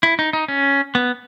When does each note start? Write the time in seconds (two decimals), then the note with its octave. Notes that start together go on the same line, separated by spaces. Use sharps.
0.03 E4
0.19 D#4
0.33 D#4
0.48 C#4
0.95 B3